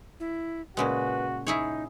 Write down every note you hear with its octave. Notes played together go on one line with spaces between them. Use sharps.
E4
A#2 C#3 G#3 F#4 B4
D#4 E4 G#4 C#5